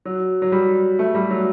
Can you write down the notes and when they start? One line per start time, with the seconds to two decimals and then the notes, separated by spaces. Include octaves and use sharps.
0.05 F#3
0.42 F#3
0.52 G3
0.99 A3
1.15 G3
1.30 F#3